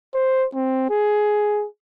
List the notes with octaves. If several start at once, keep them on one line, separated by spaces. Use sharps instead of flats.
C5
C4
G#4